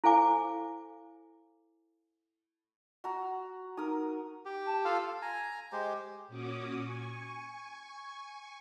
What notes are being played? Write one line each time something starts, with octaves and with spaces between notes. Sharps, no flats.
E4 A4 C5 F5 G#5 D6
F#4 A#5
D#4 A#4 D#6
G4
A5
F4 A4 F5
G#5 A#5
G#3 G4 C5
A#2 C#4 F#4 D6 D#6
G#5 C#6